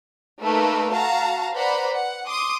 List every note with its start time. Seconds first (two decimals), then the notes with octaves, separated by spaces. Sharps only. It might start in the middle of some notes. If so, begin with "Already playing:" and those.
0.42 A3 A#3 D#4 A#4 B4
0.93 F#4 F5 A5 A#5
1.53 B4 C5 D5 F#5 A#5 B5
1.95 F#5
2.27 C6 D6 D#6